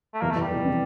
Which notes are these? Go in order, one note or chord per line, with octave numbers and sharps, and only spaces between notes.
A3
E2 A#3
A3
E2
G3
F1
C3